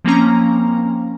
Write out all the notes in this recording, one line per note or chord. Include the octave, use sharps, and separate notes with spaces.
F3 A#3 C4 C#4 A#5